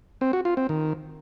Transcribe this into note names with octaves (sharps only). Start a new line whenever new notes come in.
C4
F#4
F4
C4
D#3